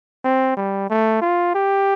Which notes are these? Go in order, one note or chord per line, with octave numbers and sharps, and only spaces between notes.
C4
G3
A3
F4
G4